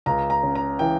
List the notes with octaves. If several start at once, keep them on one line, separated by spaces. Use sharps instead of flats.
C#2 A#5
A#5
C#3
A#5
E3 G5